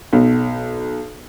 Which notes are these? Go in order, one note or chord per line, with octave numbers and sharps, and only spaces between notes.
B1